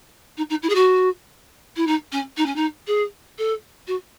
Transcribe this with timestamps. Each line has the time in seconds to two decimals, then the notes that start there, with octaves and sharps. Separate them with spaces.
0.37 D#4
0.50 D#4
0.63 E4
0.69 G#4
0.75 F#4
1.76 E4
1.87 D#4
2.12 C#4
2.37 D#4
2.46 C#4
2.56 D#4
2.87 G#4
3.38 A4
3.87 F#4